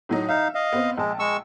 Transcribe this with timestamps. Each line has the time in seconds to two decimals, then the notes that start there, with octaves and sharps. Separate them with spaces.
0.09 A2 F#3 D#4
0.29 D#4 E5 F5
0.54 D#5 F5
0.72 B3 C4
0.98 A#1 G#3 A5
1.19 G#3 C#6 E6